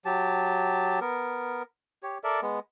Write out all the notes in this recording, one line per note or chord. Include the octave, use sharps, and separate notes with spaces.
F#3 G4 A5
B3 A#4
G4 C#5
A4 A#4 D5 E5
G#3 B3